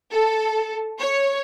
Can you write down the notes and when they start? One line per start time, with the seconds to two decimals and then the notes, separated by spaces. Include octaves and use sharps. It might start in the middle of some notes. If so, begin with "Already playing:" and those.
0.12 A4
0.99 C#5